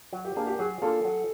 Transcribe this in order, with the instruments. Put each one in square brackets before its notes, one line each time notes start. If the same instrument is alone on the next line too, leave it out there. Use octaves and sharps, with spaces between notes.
[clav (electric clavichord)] F#3
[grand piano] G4
[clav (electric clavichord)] A#3 D4 [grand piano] G#4
[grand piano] G4
[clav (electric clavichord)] F#3 [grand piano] G#4
[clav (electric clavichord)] A#3 D4 F4 [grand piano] A4
[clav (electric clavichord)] F#3